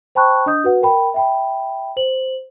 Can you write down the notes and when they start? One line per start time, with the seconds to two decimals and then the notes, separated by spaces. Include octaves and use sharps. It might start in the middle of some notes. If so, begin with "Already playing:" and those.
0.15 C5 G5 A5 B5 C#6 F#6
0.46 D4 D#5 D#6 G6
0.64 F#4 B4 F#5
0.82 A#4 G5 B5
1.14 E5 G5 B5
1.97 C5 F#7